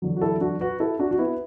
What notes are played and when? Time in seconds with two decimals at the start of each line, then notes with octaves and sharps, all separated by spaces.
0.02 E2 D3 F#3
0.17 F#4
0.21 E4 A4
0.41 D4 F#4
0.61 F#4 B4
0.80 E4 A4
0.99 D4 F#4
1.11 F#4
1.19 B3 E4